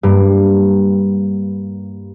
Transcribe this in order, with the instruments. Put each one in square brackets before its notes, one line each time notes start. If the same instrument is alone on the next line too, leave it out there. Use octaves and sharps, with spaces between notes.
[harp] G2 A#3